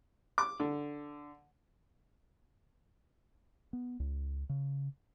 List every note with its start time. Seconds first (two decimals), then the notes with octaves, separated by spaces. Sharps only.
0.38 D6
0.60 D3
3.73 B3
4.00 C#2
4.49 C#3